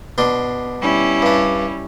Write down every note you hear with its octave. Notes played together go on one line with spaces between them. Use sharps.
B2 D4 C6
G3 C#4 E4
G2 D4